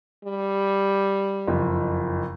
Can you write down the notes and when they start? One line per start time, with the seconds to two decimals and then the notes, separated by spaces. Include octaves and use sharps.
0.24 G3
1.47 F#1 F2